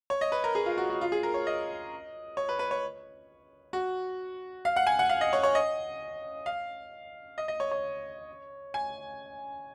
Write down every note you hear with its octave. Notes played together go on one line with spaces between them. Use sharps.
C#5
D#5
B4
A#4
G#4
F4
F#4
F#4
F4
G#4
A#4
C#5
D#5
C#5
B4
B4
C#5
F#4
F5
F#5
G#5
F#5
F5
D#5
C#5
C#5
D#5
F5
D#5
D#5
C#5
C#5
G#5